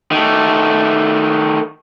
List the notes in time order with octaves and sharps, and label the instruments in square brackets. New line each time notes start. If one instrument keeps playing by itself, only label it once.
[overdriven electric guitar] D#3 A3